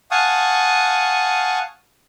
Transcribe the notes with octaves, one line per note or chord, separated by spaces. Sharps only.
F5 F#5 G#5 A5 C#6 D#6